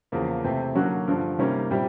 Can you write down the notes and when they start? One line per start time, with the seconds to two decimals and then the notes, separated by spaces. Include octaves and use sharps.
0.12 E2 C#3 F3 A#3
0.44 C3 E3 A3 C4
0.75 D3 F#3 A#3 C#4 F#4
1.07 G2 D3 F3
1.39 C3 D#3 G3 A#3 C#4
1.70 A#2 G3 C4 E4 G4